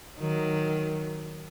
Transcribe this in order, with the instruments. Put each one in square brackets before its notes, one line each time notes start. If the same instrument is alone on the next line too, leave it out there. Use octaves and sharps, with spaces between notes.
[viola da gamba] D#3 F#3